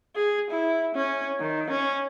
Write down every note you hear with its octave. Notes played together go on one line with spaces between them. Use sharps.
G#4
E4
C#4
D#3
C#4